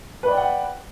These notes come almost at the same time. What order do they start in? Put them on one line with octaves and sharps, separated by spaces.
B4 D5 G5 F#5